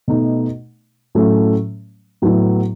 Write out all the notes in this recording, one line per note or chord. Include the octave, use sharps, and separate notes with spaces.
B2 A3 D#4
A2 F#3 A3 C#4
A2 F#3 B3 E4